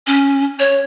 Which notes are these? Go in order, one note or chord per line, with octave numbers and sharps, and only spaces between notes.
C#4
C#5